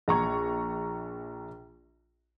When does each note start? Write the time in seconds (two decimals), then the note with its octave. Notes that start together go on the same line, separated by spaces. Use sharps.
0.08 A#1 A#5 C#6 G#6